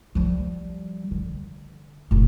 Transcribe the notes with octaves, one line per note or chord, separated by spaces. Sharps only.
F3 G3
D3
F1 A#1